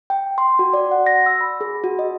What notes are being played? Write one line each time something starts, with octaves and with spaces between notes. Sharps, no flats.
G5
C6
F#4
D5
F#5
A#6
E6
B5
G#4
F#4
D#5